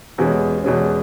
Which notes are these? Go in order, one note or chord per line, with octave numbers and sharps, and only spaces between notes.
E2 B2 G#3 C#4
E2 B2 G#3 C#4